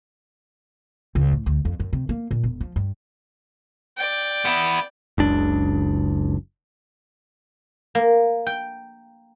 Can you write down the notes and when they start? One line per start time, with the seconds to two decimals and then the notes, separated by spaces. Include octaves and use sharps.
1.15 C#2
1.32 A2
1.46 D2
1.65 F2
1.80 F#2
1.93 C3
2.09 A#3
2.31 A#2
2.43 E1
2.61 F3
2.76 G2
3.98 D5 G5
4.45 B3 E4
5.18 F#1 C#2 D4
7.95 A#3
8.46 G5